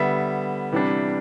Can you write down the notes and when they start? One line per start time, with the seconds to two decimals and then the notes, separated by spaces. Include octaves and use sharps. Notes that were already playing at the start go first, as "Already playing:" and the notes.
Already playing: D3 G3 B3 E5
0.72 C3 E3 G3 D4